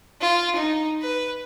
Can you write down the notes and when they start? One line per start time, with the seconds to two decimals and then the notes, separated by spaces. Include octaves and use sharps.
0.21 F4
0.56 D#4
1.02 B4